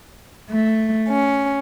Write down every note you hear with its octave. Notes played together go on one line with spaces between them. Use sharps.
A3
C#4